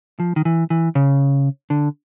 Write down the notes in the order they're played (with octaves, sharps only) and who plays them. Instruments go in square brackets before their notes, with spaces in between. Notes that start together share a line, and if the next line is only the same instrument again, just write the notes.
[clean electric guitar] F3
D#3
E3
E3
C#3
D3